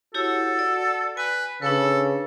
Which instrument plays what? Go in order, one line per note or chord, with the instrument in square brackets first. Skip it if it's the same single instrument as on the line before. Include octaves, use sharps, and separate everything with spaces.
[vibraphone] E4 G4 C#5 [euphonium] F#4 [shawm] A4
[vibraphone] D5
[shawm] B4 [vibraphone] G#5
[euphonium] C#3 [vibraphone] D4 B4 [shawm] A4